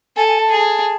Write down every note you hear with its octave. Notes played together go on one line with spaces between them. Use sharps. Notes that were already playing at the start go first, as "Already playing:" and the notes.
A4 G#5
G#5
A5
G#4